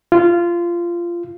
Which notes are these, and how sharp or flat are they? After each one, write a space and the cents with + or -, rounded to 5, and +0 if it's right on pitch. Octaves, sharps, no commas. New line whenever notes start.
F4 -15